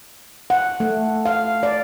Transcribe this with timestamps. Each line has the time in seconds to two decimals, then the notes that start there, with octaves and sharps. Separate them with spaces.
0.50 F#5
0.80 A3
1.26 F5
1.63 D5